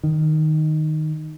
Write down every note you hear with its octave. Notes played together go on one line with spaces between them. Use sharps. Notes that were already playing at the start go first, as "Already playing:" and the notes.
D#3